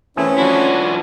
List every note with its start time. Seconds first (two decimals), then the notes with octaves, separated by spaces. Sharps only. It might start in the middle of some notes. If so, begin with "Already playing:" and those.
0.17 E3 A3 C4 C#4 E4 G#4
0.38 F3 D4 E4 F#4